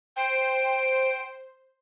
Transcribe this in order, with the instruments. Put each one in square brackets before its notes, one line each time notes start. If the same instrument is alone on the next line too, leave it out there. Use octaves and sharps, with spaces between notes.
[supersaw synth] C5 [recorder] G5